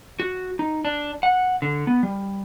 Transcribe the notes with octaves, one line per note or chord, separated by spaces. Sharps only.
F#4
D#4
D4
F#5
D3
B3
G3